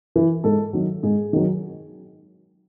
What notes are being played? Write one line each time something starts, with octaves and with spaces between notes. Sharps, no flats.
E3
G#2 A4
D#3 F#3
G#2 G#4
D#3 F#3